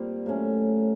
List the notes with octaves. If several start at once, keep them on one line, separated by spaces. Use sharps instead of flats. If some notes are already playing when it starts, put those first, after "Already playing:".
Already playing: A#2 G3 C4
A2 F#3 A3 C#4